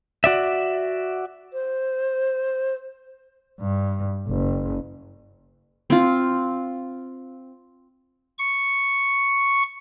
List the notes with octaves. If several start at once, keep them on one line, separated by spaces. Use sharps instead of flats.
F#4 D5 E5
C5
G2
F#1
C4 F4
C#6